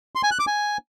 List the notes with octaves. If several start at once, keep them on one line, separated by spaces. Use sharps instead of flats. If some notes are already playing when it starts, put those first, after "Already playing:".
C6
G#5
F#6
D6
G#5